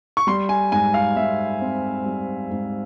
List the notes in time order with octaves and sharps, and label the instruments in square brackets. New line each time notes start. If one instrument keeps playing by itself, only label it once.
[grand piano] C#6
G3 C6
G#5
G#2 G#5
F5
G#2 E5
C4
G3
G#2